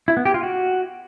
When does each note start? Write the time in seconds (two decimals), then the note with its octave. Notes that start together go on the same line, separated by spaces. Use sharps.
0.08 E4
0.17 B3
0.25 G4
0.34 F4
0.43 F#4